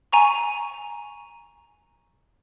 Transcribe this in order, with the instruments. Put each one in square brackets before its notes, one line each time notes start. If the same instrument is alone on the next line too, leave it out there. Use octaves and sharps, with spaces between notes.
[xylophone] G#5 A#5 C#6